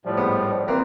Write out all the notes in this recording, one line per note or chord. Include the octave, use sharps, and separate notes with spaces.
A2 F3 G3
G#2 B3
E3 A#3 C4